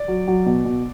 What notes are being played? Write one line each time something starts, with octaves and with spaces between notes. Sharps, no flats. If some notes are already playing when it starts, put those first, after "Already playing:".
Already playing: D5
F#3
F#3
B2
B2